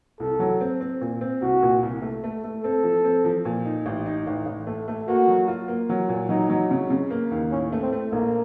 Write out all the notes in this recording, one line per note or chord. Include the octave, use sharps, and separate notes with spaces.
C2 A4
F#3
C4
C4
A#2
C4
C2 F#4
A#2
C2
A3
A3
A3
C4 A4
F3
C4
F3
A#2
D#4
A1
D#4
A1
A1
A3
A3
A#3 F#4
F#3
F4
A#3
F#3
A#2
F#3 D#4
F#3
C#3
C#3
A#3
D#2
A2 C#4
A3
C4
A3
A#1 A#3